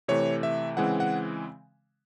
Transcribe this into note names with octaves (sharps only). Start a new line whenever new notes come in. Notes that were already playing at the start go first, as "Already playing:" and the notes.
C3 E3 A3 C#5
E5
C#3 E3 G#3 C4 F#5
F#5